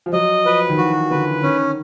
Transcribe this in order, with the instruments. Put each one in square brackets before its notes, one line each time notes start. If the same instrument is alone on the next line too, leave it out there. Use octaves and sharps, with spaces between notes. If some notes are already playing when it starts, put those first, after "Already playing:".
[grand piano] F3
[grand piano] F#3 [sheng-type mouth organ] D#5
[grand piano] F3 [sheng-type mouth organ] B4
[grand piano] D#3
[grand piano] E3 [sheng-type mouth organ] F#4
[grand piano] D3 [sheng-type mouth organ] B4
[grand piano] D#3 [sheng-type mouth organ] C#4